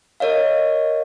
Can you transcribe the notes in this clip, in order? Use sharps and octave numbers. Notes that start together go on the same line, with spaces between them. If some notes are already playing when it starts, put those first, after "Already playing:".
A#4 C#5 D#5 F5